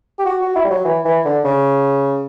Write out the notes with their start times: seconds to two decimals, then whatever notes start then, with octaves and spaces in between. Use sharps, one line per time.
0.19 G4
0.26 F#4
0.41 F#4
0.55 E4
0.64 G3
0.70 F#3
0.85 E3
1.05 E3
1.25 D3
1.44 C#3